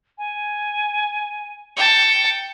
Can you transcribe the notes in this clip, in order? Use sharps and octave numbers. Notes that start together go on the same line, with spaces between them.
G#5
G5 A5 C#7